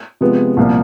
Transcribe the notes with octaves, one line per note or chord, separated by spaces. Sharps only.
C3 F3 G#3 B3
C2 A#2 F3 A#3